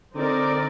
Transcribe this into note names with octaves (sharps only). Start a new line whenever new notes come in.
D3 C4 D#4 A#4 D5